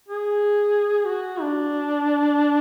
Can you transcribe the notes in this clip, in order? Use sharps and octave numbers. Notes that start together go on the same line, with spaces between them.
G#4
F#4
D4